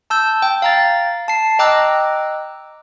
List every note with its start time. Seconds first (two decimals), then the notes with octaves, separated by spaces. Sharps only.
0.10 A5 E6 G6
0.42 G5
0.62 F5 A#5 A6
1.28 A5 C7
1.59 D#5 G5 A#5 D6 E6 F#6